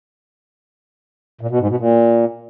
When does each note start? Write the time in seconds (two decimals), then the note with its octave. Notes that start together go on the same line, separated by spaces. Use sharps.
1.41 A#2
1.51 B2
1.60 G#2
1.69 B2
1.79 A#2